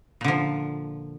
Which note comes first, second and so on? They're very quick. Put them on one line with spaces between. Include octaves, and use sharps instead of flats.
A#2 D3 F3